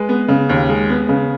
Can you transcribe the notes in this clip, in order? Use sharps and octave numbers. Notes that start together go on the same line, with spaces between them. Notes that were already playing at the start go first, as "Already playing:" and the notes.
Already playing: G#3 B4
B3
C#3
D#2
G#3
B3
C#3